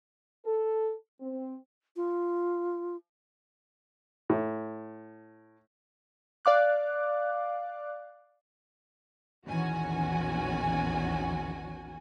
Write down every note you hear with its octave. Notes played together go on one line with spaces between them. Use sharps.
A4
C4
F4
A2
D5 F5 D6 F#6
A#1 E2 D#3 C#4 F#4 G#5